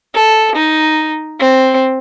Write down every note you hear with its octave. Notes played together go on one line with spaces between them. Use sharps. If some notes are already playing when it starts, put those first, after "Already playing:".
A4
D#4
C4